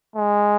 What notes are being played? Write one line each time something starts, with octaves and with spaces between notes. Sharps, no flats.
G#3